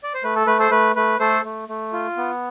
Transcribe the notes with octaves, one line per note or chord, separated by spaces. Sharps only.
D5
C5
A3 B4
A4
A3 B4
A4 C5
A3 B4
A3 B4
A3 A4 C5
A3
A3
F4
B3